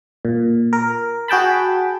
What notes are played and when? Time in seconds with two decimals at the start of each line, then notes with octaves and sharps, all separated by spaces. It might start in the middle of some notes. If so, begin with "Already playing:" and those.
0.25 A#2
0.73 A#4
1.28 F#4 G#4 G5 A5 B5